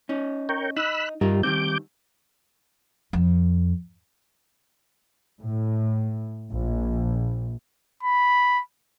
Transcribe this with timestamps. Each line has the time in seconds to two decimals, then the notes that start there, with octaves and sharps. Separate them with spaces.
0.09 C#4 D#4
0.49 A#4 C#5 G5
0.77 D#4 B5 E6 F#6
1.21 G2 G3 D#4 F4 A#4
1.43 D#3 G3 C4 D6 G6
3.13 F2
5.39 A2
6.52 A#1
8.03 B5